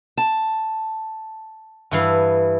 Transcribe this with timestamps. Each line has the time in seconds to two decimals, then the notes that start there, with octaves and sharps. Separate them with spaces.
0.17 A5
1.91 G2 E3 F5